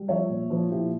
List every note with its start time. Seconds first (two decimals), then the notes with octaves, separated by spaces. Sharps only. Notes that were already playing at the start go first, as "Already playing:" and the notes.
Already playing: G3
0.08 F3 C#5 E5
0.29 A#2
0.50 F3
0.70 A#2 E4 G4